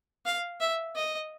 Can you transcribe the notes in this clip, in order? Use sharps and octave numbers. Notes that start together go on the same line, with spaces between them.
F5
E5
D#5